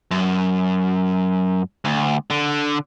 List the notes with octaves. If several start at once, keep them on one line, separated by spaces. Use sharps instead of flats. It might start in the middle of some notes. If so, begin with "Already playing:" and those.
F#2
D2
D3